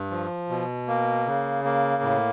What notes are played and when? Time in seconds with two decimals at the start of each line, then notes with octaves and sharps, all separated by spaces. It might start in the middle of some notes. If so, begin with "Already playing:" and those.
Already playing: G2
0.11 F3
0.49 B2
0.88 A#3
1.26 C#3
1.65 A#3
2.02 A2